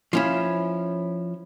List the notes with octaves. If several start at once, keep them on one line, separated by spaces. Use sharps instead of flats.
F3 C#4 E4